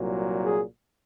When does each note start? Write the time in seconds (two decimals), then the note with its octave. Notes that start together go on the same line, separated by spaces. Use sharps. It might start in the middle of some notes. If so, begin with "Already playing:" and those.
Already playing: C2 A#2 F#3
0.43 G#4